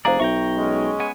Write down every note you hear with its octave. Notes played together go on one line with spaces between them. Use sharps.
F1 G#4 C5 D5 F5 A#5
B1 E5 G5 A#5 C#6
G#3 C#4
B3 G#5